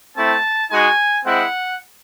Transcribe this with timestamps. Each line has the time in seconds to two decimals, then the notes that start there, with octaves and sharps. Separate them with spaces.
0.17 A3 C4 E4 A5
0.71 G#3 D#4 F#4 G#5
1.25 G#3 C4 E4 F#5